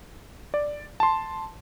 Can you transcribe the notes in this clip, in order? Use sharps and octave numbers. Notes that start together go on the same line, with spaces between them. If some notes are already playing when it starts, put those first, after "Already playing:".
D5
A5 C6